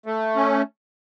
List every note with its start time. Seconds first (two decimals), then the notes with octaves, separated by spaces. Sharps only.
0.06 A3
0.36 C#4